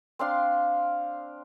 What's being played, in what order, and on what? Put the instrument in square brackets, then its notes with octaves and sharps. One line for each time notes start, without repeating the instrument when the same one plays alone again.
[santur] C4 D4 F5 C6